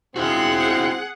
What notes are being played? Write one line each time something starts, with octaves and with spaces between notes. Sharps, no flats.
C#2 C4 E4 F#4 G#4 F#5